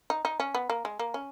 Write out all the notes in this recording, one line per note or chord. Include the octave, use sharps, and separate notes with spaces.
D#4
D#4
C#4
B3
A#3
G#3
A#3
C#4